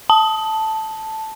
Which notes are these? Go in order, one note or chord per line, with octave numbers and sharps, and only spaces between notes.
A5